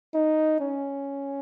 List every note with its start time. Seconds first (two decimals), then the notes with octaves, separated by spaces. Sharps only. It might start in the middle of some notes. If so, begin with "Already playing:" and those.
0.14 D#4
0.60 C#4